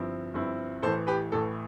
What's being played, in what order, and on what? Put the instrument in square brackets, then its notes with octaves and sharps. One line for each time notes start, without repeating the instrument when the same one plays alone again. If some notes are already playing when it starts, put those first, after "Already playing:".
Already playing: [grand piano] G1 G2 F3 C4 E4
G1 G2 F3 C4 E4
A1 A2 E3 A4 C5
G4 B4
A1 A2 E3 A4